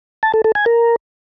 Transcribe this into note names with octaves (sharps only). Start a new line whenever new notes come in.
A5
A4
A4
G#5
A#4